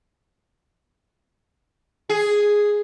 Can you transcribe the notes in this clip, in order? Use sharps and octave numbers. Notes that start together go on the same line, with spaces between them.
G#4